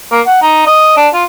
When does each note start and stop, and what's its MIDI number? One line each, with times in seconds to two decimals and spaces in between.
0.12 0.21 58
0.26 0.42 78
0.42 0.64 63
0.67 0.96 75
0.97 1.08 62
1.13 1.24 65